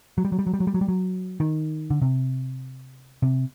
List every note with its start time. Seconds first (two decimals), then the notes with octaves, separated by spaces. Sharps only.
0.18 F#3
0.25 G3
0.32 F#3
0.39 G3
0.47 F#3
0.54 G3
0.60 F#3
0.67 G3
0.74 F#3
0.81 G3
0.88 F#3
1.40 D#3
1.90 D3
2.02 C3
3.22 C3